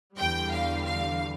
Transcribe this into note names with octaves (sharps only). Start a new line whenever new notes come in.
E2 D3 G3 G5
F5
F5